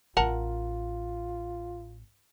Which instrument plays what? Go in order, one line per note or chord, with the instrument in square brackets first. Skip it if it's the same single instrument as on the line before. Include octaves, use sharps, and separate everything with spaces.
[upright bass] A1 [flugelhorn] F4 [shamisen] A#4 F#5 A5